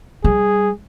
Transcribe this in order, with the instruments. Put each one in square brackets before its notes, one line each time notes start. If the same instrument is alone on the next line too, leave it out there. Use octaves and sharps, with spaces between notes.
[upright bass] G3 [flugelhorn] G#4